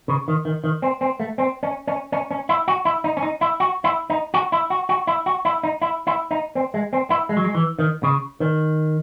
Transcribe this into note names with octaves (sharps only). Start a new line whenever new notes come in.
C#3
D#3
D#3
D#3
C4
C4
A3
C4
C#4
C#4
C#4
C#4
E4
F#4
E4
D#4
C#4
D#4
E4
F#4
E4
D#4
F#4
E4
F#4
F#4
E4
F#4
E4
D#4
E4
E4
D#4
C4
G#3
C4
E4
G#3
F#3
G#3
E3
D#3
C#3
D#3